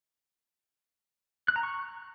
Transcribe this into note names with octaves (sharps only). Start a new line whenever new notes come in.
F#6
A#5
C#6